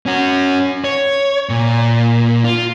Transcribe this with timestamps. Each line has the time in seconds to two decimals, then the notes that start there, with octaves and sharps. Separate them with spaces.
0.06 C#4 F#4
0.84 C#5
1.50 A#2
2.44 F4